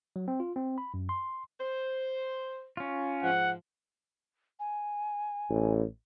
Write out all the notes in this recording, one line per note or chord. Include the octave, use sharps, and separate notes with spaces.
F#3
C4
F4
C4
B5
F#2
C6
C5
C#4 F4
G#2 F3 F#5
G#5
A1